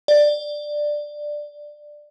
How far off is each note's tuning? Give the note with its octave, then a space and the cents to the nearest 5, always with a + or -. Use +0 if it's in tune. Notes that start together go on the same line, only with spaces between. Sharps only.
D5 +10